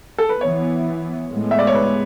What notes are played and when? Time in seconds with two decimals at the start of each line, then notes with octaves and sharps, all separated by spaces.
0.18 A4
0.29 B4
0.41 E3 B3 C#5
1.29 A2 G#3 B3
1.51 E5
1.59 D5
1.67 C#5
1.75 B4